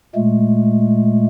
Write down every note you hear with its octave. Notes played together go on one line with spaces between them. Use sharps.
A#2 G#3 A3